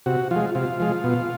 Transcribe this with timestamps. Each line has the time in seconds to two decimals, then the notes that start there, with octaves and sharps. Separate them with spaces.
0.06 C3 F#4
0.31 F3 F4
0.36 G#3
0.55 C3 F4
0.80 F3 G#3
1.04 B2